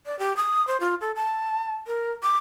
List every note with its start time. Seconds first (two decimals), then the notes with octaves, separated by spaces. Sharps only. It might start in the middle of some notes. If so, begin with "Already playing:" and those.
0.06 D5
0.19 G4
0.37 D#6
0.67 C5
0.80 F4
1.01 A4
1.16 A5
1.87 A#4
2.23 D6